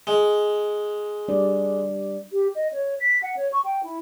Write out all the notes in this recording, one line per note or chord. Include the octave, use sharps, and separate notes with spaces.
G#3
G3 D4 D5
G4
D#5
C#5
B6
F#5
C#5
C#6
G5
E4